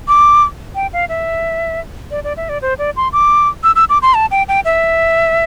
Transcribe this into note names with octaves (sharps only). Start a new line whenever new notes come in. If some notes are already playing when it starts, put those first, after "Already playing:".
D6
G5
F5
E5
D5
D5
E5
D5
C5
D5
C6
D6
E6
E6
D6
C6
A5
G5
G5
E5